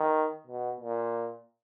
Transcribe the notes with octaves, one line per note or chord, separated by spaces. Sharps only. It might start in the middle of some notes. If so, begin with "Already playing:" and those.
Already playing: D#3
B2
A#2